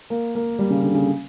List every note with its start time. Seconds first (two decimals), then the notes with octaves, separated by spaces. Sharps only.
0.10 A#3
0.35 A#3
0.59 G3
0.70 C#3
0.83 D3
0.94 C#3